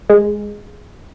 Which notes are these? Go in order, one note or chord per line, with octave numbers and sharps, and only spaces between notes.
G#3